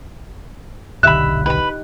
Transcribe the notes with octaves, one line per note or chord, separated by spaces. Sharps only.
D#1 B1 D3 D#4 G4 E5 B5 F#6
D#4 G4 B4 G5 B5